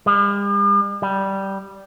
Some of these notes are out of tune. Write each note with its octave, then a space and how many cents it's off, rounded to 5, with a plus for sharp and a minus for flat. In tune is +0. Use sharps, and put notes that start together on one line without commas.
G3 +45
G3 -10